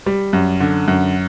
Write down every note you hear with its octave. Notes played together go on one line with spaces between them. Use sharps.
G3
F#2
D3
F#2